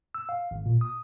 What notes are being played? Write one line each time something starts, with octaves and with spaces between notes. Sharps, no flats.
E6
F5
G#1
A#2
D#6